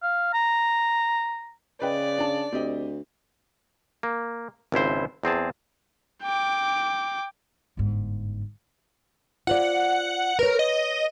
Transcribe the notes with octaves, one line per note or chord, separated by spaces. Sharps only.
F5
A#5
C#3 B4 D5 D#5 G5
D4 A5
D2 C4 G4 D#5
A#3
G#1 C#2 E4 C5
E2 C4 G#4 A5
G5 D6
G1 G#2
F4 C5 D5 F#5
A#4 B4 C#5
D#5